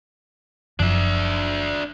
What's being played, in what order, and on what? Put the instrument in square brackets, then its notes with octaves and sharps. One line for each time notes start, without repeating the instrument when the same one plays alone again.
[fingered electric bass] F#1 F#2 F3 [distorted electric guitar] D4 E5